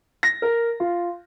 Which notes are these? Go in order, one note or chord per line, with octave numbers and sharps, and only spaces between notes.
A#6
A#4
F4